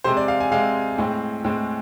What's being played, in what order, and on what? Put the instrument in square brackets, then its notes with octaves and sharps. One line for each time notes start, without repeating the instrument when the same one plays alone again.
[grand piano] C3 G#3 C4 C5
D5
F5
G#5
C3 G#3 C4 F5
A2 G#3 C4
A2 G#3 C4